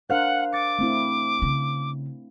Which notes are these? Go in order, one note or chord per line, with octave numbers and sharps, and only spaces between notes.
D4 A#4 C5 F5 F#5 F#6
D6 A6 C#7
A3 C4 E4
C#3